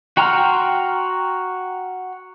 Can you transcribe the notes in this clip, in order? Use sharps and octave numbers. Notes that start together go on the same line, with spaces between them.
F#4 G5 A#5 C6 F6